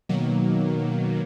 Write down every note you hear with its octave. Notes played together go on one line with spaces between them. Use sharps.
B2 D#3 F#3 A#3